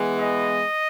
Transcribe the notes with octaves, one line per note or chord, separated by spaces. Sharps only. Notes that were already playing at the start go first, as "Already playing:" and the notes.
Already playing: E3 G#3 B3
D#5